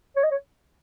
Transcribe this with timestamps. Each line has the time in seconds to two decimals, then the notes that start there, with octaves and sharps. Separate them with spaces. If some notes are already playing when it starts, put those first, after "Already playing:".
0.16 C#5
0.24 D#5
0.31 C#5